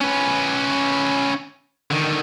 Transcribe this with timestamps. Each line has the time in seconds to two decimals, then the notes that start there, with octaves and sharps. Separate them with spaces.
0.01 C#4 B4
1.91 D3 D#3